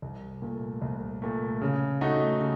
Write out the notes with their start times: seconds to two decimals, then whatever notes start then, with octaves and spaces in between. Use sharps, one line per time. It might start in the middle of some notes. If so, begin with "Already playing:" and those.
0.02 C2
0.42 A#2 A3
0.82 C2
1.22 A#2 A3
1.61 C#3
2.01 A3 D#4 F#4
2.41 C#3